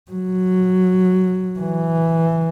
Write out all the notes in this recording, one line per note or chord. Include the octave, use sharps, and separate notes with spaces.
F#3
E3